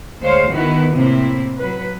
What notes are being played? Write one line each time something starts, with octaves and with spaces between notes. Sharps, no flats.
D2 G#3 A3 C5 C#5 F5
D#3 B3 E4 F#4 B4
A2 C3 A#3 C4 E4
F#3 B4